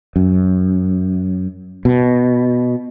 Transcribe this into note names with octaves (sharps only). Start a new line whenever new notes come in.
F#2
B2